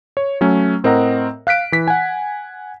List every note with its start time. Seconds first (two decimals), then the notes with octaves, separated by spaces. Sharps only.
0.17 C#5
0.41 F#3 A3 C#4
0.84 A2 C4 A#4 D#5 F#5 A#5
1.47 F5 F#6 B6 D7
1.72 E3 B6
1.88 F#5 G#5